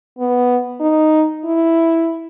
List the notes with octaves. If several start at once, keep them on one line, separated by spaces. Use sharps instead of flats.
B3
D#4
E4